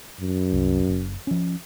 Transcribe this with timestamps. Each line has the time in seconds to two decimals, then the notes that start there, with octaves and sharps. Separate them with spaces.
0.21 F#2
0.52 C2
0.88 F#1
1.27 F3 C#4